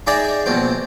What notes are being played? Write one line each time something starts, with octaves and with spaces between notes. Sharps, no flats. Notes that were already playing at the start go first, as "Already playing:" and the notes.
D#4 G#4 D5 E5 G5 A#5
A#1 B2 C4 G5